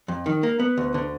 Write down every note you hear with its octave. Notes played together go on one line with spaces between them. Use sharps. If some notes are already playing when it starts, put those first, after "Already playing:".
F2
D#3
A#3
B3
D2
D3